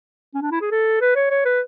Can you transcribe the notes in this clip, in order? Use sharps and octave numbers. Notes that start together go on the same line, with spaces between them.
C#4
D4
E4
G#4
A4
B4
C#5
C#5
B4